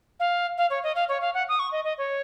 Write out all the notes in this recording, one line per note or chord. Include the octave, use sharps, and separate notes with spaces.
F5
F5
C#5
D#5
F5
C#5
F5
F#5
D#6
C#6
D#5
D#5
C#5